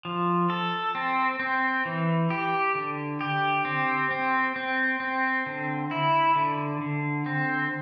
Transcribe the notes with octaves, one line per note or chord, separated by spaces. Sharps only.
F3
A4
C4
C4
E3
G4
D3
G4
C4
C4
C4
C4
D3
E4
D3
D3
C4